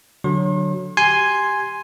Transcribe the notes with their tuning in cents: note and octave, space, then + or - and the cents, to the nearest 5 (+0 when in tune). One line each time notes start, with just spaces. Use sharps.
D3 +0 F#3 +0 C6 +45
G4 +0 G#5 +0 C6 +0